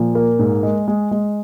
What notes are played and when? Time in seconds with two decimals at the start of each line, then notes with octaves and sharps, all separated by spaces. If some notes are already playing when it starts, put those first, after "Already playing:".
Already playing: A#2 F3
0.15 A#3
0.39 G#2
0.63 G#3
0.88 G#3
1.11 G#3